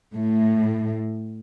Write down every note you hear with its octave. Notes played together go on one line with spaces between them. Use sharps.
A2